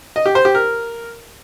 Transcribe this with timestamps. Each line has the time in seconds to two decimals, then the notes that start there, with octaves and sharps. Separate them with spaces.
0.16 D#5
0.26 G4
0.35 C5
0.45 G4
0.55 A#4